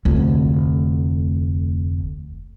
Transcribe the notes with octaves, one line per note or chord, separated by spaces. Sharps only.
F1 D2